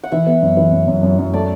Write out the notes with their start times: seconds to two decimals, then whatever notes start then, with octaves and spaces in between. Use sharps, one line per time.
0.03 F#5
0.12 E3 E5
0.27 B3
0.42 F#2
0.57 E3
0.73 F#2
0.88 F#2
1.03 F#2
1.19 F#2
1.33 A3 D5